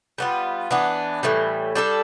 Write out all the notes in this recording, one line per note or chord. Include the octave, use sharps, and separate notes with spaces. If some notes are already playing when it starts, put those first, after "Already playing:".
G3 B3 F4
E3 B3 D4
A2 E3 G3
G3 D4 A4